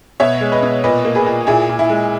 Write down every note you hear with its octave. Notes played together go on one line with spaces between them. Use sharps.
B2 C#5 E5
G#3
B4 D#5
B2
A#2 B4 D#5
A#3
G#4 B4
A#2
A#2 E4 G#4
A#2
E4
G#3